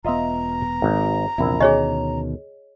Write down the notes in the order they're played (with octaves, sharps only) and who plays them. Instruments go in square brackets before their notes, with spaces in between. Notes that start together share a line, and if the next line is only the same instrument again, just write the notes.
[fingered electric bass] E1 B3 [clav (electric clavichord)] F4 D#5 E5 [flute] A#5
[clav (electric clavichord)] G#1
[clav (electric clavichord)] A#1 E4 [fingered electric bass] E2 C3
[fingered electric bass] D2 B2 D#3 [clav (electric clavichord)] C#4 [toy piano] G#4 C#5 D#5